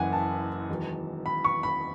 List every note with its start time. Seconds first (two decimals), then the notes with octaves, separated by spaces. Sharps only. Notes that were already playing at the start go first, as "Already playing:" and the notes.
Already playing: F#1 F#2 E3 F#5 G#5
0.13 A5
0.69 E1 E2 D#3 F#3
1.26 B5
1.45 C#6
1.63 B5